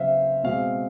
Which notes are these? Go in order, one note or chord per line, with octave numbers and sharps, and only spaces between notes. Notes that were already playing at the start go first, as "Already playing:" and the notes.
Already playing: C#3 F#3 B3 C5 E5 F5
B2 G#3 C4 F5